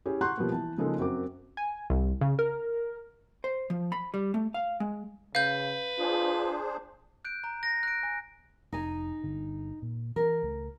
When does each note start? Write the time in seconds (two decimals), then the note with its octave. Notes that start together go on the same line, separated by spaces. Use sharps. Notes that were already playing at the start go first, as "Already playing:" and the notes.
0.06 C#4 E4 G4 G#4
0.21 F#5 A#5 C6 C#6 F#6 G6
0.38 B2 F3 G3 A#3 B3
0.50 E3 A5
0.78 C#3 F3 G#3 A#3 D#4 A4
0.98 F#2 F#3 C4 A#4 D6
1.57 G#5
1.90 C2
2.21 C#3
2.39 A#4
3.44 C5
3.70 F3
3.92 B5
4.14 G3
4.34 A3
4.54 F5
4.80 G#3
5.35 C#3 B4 F5 G6
5.99 D4 F4 G#4 C5
7.25 F#6 G6 D7
7.44 A#5
7.63 A#6
7.83 F#6 D7
8.03 G#5
8.72 F1 D#4 G#5
9.24 G1 D3
9.82 A#2
10.16 E3 D4 A#4
10.42 C#2 A3